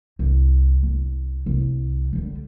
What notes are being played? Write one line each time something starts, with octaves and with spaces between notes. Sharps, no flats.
C2
C2
C2
D3 G3